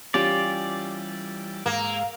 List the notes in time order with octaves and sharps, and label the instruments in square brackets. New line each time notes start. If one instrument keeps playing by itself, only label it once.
[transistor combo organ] E3 G3 [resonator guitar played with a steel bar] C#4 F4 G4 [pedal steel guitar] D5
[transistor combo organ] G#2 E6 [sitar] A#3